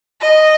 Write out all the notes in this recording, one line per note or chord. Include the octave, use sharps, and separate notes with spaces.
D#5